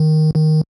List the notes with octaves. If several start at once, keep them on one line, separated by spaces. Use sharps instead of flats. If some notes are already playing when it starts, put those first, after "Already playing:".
Already playing: D#3
D#3